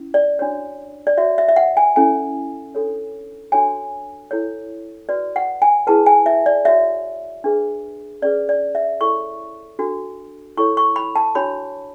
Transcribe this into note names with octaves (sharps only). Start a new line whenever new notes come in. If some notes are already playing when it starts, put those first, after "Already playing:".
Already playing: C#4 E4
D5
D4 F#4 C#5
D5
F#4 C#5 E5
E5
E5
F#5
G#5
C#4 E4 A4 G#5
D4 A4 C#5
D4 F#4 A4 C#5 G#5
E4 A4 C#5
F#4 B4 D5
F#5
G#5
E4 G#4 B4 A5
G#5
E5
D5
F#4 C#5 E5
D4 G#4 B4
C#4 G#4 B4 D5
D5
E5
E4 A4 C#5 C#6
D4 F#4 A4
E4 A4 C#5 C#6
C#6
B5
A5
D4 F#4 C#5 B5